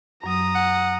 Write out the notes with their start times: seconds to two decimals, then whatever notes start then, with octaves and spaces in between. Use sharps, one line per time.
0.24 F#2 F#3 A#5 D#6
0.55 F#5